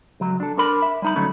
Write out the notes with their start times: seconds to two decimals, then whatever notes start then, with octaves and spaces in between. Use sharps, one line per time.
0.20 C#2 F#3
0.40 D4 A4
0.57 D4 A#4 B5
0.82 E5
1.02 G3 D#4 B5
1.16 D3 F#3 A3 C#4 D#4